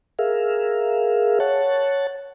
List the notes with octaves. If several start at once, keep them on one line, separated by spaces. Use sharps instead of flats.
G#4 A#4 E5 F5
C#5 F#5 A5